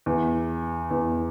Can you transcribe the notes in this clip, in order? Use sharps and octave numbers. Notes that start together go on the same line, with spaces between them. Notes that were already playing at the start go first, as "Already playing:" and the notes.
E2
E2